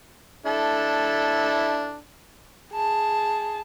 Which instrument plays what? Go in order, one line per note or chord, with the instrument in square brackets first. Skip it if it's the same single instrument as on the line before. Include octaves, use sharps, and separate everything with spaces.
[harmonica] D4 E4 A4
[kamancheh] G#4 A5